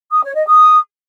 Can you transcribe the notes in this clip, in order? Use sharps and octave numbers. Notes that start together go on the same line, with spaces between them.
D#6
C#5
D#5
D#6